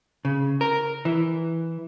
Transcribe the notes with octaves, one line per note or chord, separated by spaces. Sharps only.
C#3
A#4
E3